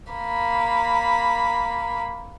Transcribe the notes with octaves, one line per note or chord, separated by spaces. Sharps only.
A#3 B5